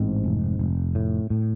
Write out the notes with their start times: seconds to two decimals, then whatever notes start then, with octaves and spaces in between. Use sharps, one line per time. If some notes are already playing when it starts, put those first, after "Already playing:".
Already playing: A1 G#2 C4
0.24 F1
0.59 F1
0.95 A2
1.30 A2